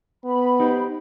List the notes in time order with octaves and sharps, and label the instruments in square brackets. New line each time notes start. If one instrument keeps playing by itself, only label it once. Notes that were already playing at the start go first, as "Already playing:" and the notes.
[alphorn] B3 [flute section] B5
[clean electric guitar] D#4 G4 C5